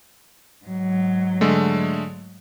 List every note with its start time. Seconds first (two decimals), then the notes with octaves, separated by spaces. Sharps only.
0.65 G#2 F#3
1.41 D3 G#3 A3